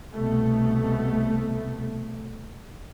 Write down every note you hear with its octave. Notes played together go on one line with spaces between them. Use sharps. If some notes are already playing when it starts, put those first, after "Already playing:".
C2 B2 A3